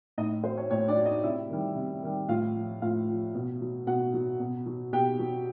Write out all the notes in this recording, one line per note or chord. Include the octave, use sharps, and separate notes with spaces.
A2 D#4 D#5
F#3 C5
C#5
A2 C#5
D4 D5
F#3
D#4 D#5
C3 E4 E5
D#3 G3
C3
D#3 G3
A2 F4 F5
F3
A2 F4 F5
F3
B2
F#3
B2 F#4 F#5
F#3
B2
F#3
B2 G4 G5
F#3